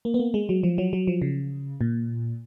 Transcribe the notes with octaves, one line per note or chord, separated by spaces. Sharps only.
A#3
B3
A#3
G#3
F#3
F3
F#3
F#3
F3
C#3
A#2